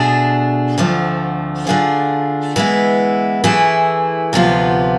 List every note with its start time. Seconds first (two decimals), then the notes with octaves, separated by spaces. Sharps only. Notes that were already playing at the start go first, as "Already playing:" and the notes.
Already playing: B2 A3 D4 G#4
0.78 D2 D3 F3 A3 C4
1.67 D3 A3 D4 F4 G#4
2.56 E3 G#3 B3 E4
3.44 E3 A3 E4 G#4
4.33 D2 C3 F3 B3 F4